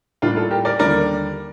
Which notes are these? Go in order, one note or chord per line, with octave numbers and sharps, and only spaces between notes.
A2 G3 A#3 D4 F4
F4 A4
G4 A#4
A#4 D5
D#2 D3 G3 A#4 D5